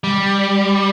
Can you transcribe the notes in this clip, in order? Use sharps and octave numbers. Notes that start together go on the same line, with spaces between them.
G3